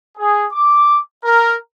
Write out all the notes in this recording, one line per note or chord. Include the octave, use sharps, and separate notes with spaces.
G#4
D6
A#4